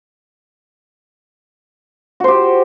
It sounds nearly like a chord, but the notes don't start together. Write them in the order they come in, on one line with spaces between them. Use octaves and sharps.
F#4 C5 G4